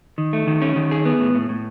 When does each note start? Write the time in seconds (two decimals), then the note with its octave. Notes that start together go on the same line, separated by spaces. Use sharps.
0.18 D#3
0.33 A3
0.47 D#3
0.62 C#4
0.76 D#3
0.91 G#4
1.05 B3
1.20 A2
1.35 A2
1.49 A2